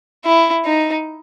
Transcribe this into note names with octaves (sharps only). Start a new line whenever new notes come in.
E4
D#4